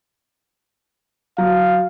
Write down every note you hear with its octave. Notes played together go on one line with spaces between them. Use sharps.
F#3 F5